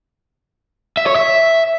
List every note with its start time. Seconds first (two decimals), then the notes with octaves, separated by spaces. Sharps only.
0.97 E5
1.07 C#5
1.16 E5